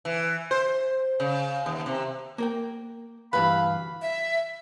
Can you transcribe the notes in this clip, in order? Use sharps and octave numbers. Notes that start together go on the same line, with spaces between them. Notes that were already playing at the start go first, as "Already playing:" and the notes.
E3
C5
C#3
D#2
C3
A#3 A#4 G5
D2 G2 E3 B4 F5 B5
E5